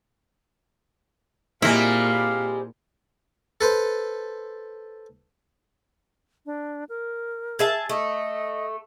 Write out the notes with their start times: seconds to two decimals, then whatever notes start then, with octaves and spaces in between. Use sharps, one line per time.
1.62 A#2 G3 G#3 A#3 C4 E4 F5
3.61 A4 B4 C5
6.46 D4
6.89 A#4
7.59 G#4 E5 A5
7.89 A3 D#5